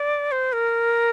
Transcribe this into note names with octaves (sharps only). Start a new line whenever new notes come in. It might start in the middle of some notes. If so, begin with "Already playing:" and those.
Already playing: D5
C5
A#4